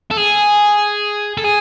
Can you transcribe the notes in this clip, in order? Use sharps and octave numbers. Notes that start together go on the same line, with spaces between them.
A4
G#4
A4
G#4